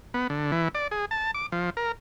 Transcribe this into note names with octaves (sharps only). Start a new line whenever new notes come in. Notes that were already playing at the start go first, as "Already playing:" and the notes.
B3
D3
E3
D5
G#4
A5
D6
F3
A#4